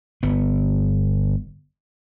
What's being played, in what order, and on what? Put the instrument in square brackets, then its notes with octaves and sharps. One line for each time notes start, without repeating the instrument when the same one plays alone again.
[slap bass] G1 B3